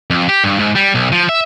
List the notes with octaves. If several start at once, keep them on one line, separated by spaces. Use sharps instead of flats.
F2
G4
G2
G#2
G3
B1
F3
E5